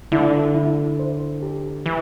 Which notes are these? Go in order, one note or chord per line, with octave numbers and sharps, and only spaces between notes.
D3 E4
E4
C5
G4
E3